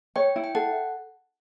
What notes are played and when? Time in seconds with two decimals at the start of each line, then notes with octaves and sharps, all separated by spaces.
0.16 C#5 G5
0.36 E4
0.44 G5
0.55 A4 F#5